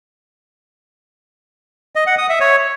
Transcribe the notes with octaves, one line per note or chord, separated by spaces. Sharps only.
D#5
F#5
D#6
E5
C#5